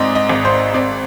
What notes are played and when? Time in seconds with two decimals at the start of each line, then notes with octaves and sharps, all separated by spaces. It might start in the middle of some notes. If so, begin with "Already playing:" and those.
Already playing: G#1 G#2 C4 G#4 D5 D#5
0.15 D#5
0.29 G#1
0.45 C5
0.74 C4 D5